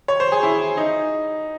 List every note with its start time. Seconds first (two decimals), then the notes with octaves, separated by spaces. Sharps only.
0.08 C#5
0.20 C5
0.32 G#4
0.43 E4
0.77 D#4